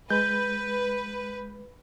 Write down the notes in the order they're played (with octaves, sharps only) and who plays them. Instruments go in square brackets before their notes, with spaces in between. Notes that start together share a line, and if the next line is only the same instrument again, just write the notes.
[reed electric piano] G#3 [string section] B4 [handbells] G6